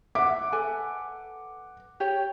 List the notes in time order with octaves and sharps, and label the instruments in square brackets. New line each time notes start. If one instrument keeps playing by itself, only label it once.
[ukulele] E5 [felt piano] F#5 D6
[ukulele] A4 B4 G#5
G4 C#5 G5